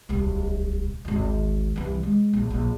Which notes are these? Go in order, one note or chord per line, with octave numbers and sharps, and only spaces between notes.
D1 C2
G#1 D2
C2 E3
G#3
A#1
A#1